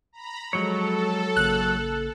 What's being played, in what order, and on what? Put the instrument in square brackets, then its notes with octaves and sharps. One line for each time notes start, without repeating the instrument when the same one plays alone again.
[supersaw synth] A#5 B5
[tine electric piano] F3 G#3 [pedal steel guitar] F#3 C#5 [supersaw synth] A4
[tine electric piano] A1 C#3 A#3 [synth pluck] F#6